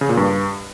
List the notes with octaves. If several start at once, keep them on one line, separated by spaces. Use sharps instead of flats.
C#3
A#2
G2